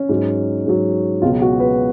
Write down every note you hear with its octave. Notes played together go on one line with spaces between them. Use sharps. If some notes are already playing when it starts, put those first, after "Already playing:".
Already playing: C#4
G#2 F#3
G#2 F#3
C#2 B2 F#3 F4
F#4
B4